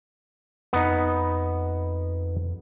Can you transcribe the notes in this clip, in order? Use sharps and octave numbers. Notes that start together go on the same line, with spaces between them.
F2 B3 D#4